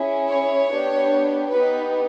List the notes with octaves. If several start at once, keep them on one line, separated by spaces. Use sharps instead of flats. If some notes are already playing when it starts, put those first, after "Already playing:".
Already playing: C#4 E4 G#4
C#5
B3 D4 G4
B3 D#4 G4 B4